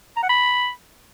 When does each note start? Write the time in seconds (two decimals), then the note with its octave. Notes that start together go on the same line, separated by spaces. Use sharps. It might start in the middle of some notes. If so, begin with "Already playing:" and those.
0.17 A#5
0.23 F#5
0.29 B5